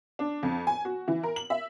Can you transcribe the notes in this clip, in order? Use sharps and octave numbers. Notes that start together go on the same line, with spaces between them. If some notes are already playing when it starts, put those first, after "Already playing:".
D4
F2
G#5
F#4
E3
A#4
F#7
E5